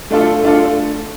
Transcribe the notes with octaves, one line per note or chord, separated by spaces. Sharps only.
A3 D4 F4 A4
A3 D4 F4 A4